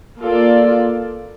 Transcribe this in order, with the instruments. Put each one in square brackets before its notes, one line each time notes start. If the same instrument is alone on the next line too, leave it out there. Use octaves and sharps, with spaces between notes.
[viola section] A#3 F4 A4 D5